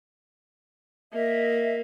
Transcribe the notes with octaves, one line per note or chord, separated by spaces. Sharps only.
A#3 D#5 E5